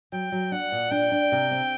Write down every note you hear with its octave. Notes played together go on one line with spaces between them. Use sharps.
F#3 G5
F#3
D4 F#5
A#2
D4 G5
D4
C3
C4